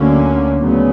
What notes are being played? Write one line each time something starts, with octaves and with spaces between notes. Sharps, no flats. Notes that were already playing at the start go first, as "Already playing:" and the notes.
Already playing: D2 D3 F#3 A#3 C#4
D2 C#3 F#3 B3